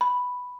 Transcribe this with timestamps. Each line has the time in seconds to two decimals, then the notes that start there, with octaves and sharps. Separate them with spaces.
0.01 B5